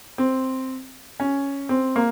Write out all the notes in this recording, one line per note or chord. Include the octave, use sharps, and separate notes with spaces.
C4
C#4
C4
A#3